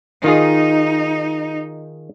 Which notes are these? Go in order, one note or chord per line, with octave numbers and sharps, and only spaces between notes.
D#3 D#4 F4 G#4